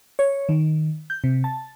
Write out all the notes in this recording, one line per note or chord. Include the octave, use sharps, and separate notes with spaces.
C#5
D#3
G6
C3
A5